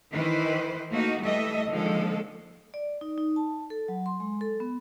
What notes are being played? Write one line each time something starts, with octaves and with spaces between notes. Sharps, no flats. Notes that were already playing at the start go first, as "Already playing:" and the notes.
D#3 E3 E4 B4 C5
A3 A#3 D#4 F#4
E3 G3 A3 A4 D#5 E5
D3 D#3 F3 G#3 A#3 A4
D5
D#4
D#4
A5
A4
F#3
C6
G#3
A4
B3